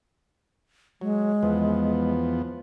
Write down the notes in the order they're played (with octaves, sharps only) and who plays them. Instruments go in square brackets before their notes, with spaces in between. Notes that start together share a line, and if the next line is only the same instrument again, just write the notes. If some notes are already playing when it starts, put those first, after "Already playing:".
[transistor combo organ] F#3 [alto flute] G#3
[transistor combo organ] E2 F3 B3